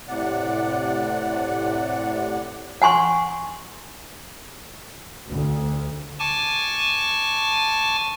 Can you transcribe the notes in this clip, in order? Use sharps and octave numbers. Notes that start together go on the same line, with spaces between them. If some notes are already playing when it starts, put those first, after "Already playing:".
A2 C3 D5 F#5
F#5 G#5 C6 C#6
D2
G#5 A5 C#6 D6